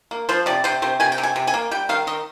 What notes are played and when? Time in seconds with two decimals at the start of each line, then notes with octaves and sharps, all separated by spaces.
0.11 A#3
0.29 F3 C5
0.46 C3 D5
0.64 C3 C5
0.82 C3 C5
1.00 C3 G#5
1.12 G5
1.18 C3
1.23 G#5
1.36 C3
1.47 G#5
1.54 A#3
1.71 G3 G5
1.89 D#3 F5
2.07 D#3 D#5